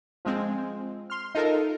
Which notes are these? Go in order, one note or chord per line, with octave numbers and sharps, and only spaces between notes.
F3 G#3 C4
C6 F6
D#4 F4 A4 A#4